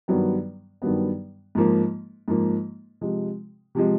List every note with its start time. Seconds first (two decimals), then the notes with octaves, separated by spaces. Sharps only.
0.08 G2 D#3 F#3 B3
0.82 G2 D#3 F#3 B3
1.55 G#2 F3 A#3
2.28 G#2 F3 A#3
3.01 C3 F3 G#3
3.75 C3 F3 G#3